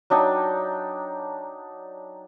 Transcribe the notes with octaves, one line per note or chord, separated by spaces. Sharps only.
F#3 D4 D#4 G5